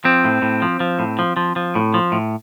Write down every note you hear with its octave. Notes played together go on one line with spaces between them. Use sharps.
F3 C4
A2
A2
F3
F3
A2
F3
F3
F3
A2
F3
A2